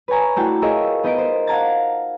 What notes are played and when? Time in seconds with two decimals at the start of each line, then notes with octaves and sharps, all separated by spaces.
0.08 B4 C#5 G#5 A#5
0.36 A3 D4 E4 F#4 G5 A5
0.62 F4 G#4 A#4 C#5 D#5 E5
1.04 B3 D#4 A#4 D#5 B6 D7
1.18 C5
1.47 F5 F#5 A5 A#5 G#6 A6